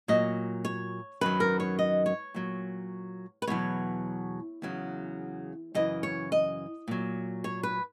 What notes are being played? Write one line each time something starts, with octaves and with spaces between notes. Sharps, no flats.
A#2 F#3 D#5
C#5
F#2 D#3 F#3 B4
A#4
C#5
D#5
C#5
A#2 F#3
B4
E2 B2 F#3 C#5
E2 C#3 F#3
F#2 C#3 E3 D#5
C#5
D#5
A#2 F#3
C#5
B4